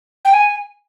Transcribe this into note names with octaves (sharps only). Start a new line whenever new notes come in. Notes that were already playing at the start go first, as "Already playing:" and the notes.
G5
G#5